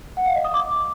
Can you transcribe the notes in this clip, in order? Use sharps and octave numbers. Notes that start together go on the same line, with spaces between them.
F#5
F5
D#5
D#6
D6